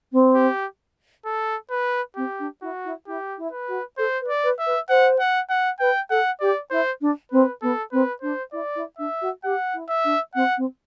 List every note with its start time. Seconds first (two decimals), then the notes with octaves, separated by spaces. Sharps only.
0.12 C4
0.34 G4
1.25 A4
1.70 B4
2.16 C4 G4
2.39 D4
2.62 E4 F#4
2.85 E4
3.07 E4 G4
3.38 E4
3.52 B4
3.68 F#4
3.98 A4 C5
4.21 B4
4.28 D5
4.43 B4
4.59 E5
4.66 B4
4.89 C5 F#5
5.19 F#5
5.49 F#5
5.80 B4 G5
6.10 A4 F#5
6.40 G4 D5
6.70 E4 C5
7.01 D4
7.31 C4 B4
7.62 B3 A4
7.92 C4 B4
8.22 D4 C5
8.52 E4 D5
8.75 E4
8.98 D4 E5
9.21 F#4
9.44 G4 F#5
9.74 E4
9.89 E5
10.04 D4
10.35 C4 F#5
10.57 C4